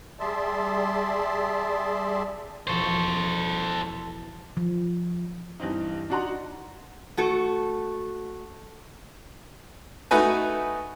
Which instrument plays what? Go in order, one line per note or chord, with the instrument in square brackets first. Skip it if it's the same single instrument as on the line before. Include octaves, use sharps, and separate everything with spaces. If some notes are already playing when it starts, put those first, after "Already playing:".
[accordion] G3 G#4 D5 E5 A5 C6
[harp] E1 F3 C#6 [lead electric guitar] A4 C5
[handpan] F3
[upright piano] G2 E3 C4 D#4
D4 D#4 F#4 F#5 A#5 C6
[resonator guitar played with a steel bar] A3 F#4 A4
[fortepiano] A3 D#4 F#4 B4 G#5